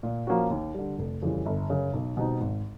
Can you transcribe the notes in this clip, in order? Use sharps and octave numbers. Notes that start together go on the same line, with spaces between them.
A#2
F3 A#3 C#4 F#4
D#2
D3 G3
F1
F2 C#3 E3 G3
G1
F#2 C#3
B1
B2 G3 C4 D#4
G#1